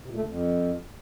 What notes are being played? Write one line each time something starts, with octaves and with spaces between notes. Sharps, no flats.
C3
A#2
A3
D3
F2